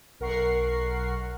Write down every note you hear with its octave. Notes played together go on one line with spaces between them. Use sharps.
B1 A#4 F#5 C#6 C7